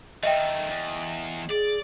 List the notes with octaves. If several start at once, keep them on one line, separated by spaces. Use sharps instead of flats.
D#3 A3 D#5 E5 G5
E2
G#4 D5